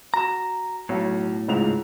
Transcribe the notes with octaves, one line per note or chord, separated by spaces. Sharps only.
F#4 A#5 E7
B1 A2
C#2 G#2 F7